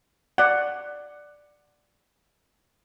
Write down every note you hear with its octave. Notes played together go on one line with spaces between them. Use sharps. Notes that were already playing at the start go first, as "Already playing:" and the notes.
D5 F#5